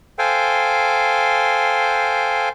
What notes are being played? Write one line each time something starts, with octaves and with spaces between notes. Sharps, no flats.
A4 C5 F5 G5 G#5